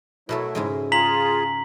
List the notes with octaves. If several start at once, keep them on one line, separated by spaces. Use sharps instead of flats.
B2 F#3 A3 E4 A4
G#2 C#3 G#3
F4 G#4 A#5 B6 F#7